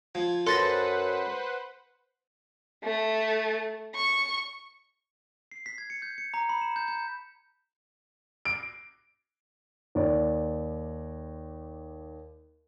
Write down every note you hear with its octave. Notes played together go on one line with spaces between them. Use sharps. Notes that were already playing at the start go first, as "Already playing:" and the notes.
F3 G#6
F#2 A4 B4 C5 F#5 C6 A6 A#6
A3
C#6
C7
B6
G#6
C#7
G6
C#7
A#5
B5
E7
G6
G6
D7
D#2 D5